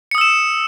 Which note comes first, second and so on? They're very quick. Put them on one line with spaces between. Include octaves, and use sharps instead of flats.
C#7 D#6 E6 E7